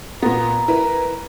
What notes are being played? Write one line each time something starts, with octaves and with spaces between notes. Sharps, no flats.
A#2 B3 A#5
E4 A#4 B4